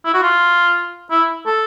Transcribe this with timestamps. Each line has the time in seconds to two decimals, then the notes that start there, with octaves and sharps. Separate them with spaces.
0.05 E4
0.14 F#4
0.23 F4
1.11 E4
1.46 A4